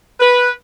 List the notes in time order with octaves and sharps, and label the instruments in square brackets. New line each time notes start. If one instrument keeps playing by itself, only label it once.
[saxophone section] B4